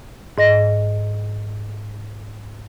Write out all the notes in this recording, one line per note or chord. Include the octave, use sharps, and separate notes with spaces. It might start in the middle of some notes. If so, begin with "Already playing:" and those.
G#2 D#5 A#6